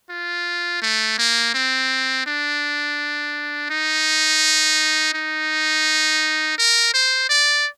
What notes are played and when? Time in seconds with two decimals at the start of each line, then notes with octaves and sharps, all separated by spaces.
0.10 F4
0.82 A3
1.18 A#3
1.54 C4
2.26 D4
3.70 D#4
5.14 D#4
6.58 A#4
6.94 C5
7.29 D5